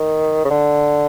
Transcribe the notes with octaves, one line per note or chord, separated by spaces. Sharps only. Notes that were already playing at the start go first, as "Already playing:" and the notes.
Already playing: D#3
C#3
D3